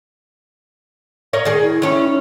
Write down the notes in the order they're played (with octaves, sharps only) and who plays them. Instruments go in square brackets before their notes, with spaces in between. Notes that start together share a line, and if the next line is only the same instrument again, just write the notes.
[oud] A#4 C#5 D#5
D#3 G#4
[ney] E4
[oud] D#3 C#4